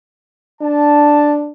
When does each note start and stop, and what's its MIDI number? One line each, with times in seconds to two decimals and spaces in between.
0.62 1.52 62
0.62 1.34 81